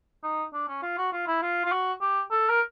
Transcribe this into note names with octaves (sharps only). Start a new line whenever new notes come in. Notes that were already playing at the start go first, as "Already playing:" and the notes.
D#4
D4
C#4
F4
F#4
F4
E4
F4
F4
F#4
G4
A4
A#4